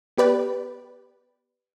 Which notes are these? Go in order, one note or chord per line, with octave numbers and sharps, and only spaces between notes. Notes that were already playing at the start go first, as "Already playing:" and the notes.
B3 G4 B4 D5